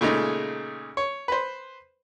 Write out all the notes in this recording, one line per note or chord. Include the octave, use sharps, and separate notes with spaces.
A#2 C#3 G#3 A3 D#4
C#5
B4 C5